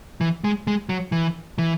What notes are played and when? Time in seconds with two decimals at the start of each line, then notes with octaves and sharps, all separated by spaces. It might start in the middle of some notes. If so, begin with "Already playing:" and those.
0.21 E3
0.44 G#3
0.67 G#3
0.89 F#3
1.12 E3
1.58 E3